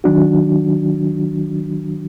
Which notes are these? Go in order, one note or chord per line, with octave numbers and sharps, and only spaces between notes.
D#3 F#3 D4 F#4